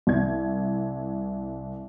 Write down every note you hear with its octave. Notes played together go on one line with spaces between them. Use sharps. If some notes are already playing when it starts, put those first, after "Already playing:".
C2 G#6